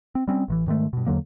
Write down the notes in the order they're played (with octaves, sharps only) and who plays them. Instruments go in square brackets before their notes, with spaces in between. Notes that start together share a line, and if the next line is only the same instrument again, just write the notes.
[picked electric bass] C4
G3 C4 C#4
A1 D#3 E3
G#2 D#3 G#3 A3
G2 B2
E2 D3 F#3 A#3